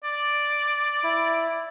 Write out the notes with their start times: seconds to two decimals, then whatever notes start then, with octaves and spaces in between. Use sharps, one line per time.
0.04 D5
1.04 E4